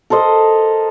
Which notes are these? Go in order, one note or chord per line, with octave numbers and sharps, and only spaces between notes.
A4 A#4 C5 D#5